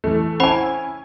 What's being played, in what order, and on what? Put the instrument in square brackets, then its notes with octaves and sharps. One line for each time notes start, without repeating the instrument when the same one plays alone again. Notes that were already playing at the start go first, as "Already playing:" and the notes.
[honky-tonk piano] E3 A3
[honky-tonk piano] C#4 E4 G#5 [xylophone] C5 F#5 B5